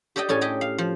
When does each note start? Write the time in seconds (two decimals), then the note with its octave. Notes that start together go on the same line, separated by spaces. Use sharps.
0.16 G4 A4 D5 D#5 G5
0.29 A2 C#4 A4 G#5
0.41 G4 D#5 G5
0.61 F5
0.78 F3